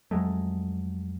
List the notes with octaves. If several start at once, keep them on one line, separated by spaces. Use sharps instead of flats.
F2 F#3 G#3 A3